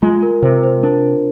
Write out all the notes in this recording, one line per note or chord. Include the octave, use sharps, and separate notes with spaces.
G#3 F4
A#4
C3 C5
C5
D4 A#4